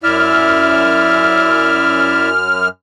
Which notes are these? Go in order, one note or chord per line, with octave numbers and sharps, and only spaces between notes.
F#2 E4 D5 E5 F6